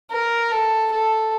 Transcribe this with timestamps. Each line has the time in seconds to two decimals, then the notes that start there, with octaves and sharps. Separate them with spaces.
0.12 A#4
0.52 A4
0.92 A4